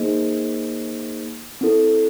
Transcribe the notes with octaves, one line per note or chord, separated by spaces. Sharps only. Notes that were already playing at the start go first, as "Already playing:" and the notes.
Already playing: A#3 D#4 G#4 C5 D#5
C4 E4 A4